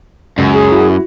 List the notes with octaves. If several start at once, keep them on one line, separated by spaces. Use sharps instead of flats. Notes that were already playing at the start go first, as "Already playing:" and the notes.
C#2 F#2
G#4
E4 F#4